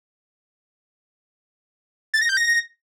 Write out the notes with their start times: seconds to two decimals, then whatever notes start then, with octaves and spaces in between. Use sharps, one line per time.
2.14 A6
2.21 A#6
2.29 G6
2.37 A#6